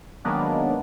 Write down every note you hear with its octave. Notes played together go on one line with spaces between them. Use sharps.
D#3 F#3 G#3 A#3 B3 D4